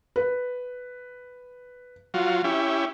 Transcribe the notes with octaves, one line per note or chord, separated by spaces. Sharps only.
B4
F#3 F4
C#4 E4 G4